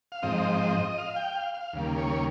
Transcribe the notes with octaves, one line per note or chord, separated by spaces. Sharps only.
F5
G#2 F3 C4 D#5
F5
G5
F5
F5
D#2 C#3 G3 A#3
C#5